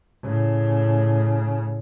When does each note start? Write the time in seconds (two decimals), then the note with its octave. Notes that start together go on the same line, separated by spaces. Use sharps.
0.24 A2 C#3